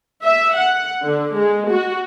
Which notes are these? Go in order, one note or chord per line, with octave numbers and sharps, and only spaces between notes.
E5
F#5
D3
G#3
F#4